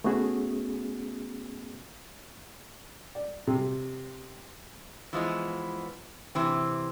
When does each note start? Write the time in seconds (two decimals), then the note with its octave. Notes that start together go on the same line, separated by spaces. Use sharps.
0.04 A3 B3 C#4 F#4 G#4
3.15 D5
3.47 C3
5.13 E3 F3 G#3 B3
6.35 C3 E3 C4